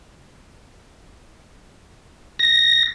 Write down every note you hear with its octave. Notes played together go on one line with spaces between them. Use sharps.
A#6